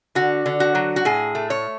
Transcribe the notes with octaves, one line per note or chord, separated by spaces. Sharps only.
D3 F#4
D3
F#4
F#3
F#4
A2 G#4
A3
C#5